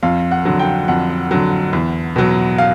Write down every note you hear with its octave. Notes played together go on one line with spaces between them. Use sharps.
F2 F5
F#5
D3 F#3
G5
F2 F#5
D3 F#3
E2
B2 F#3
F5